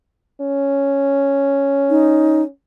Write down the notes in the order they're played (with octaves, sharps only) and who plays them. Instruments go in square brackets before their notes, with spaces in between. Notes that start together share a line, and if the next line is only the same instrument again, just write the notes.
[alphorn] C#4
[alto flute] D#4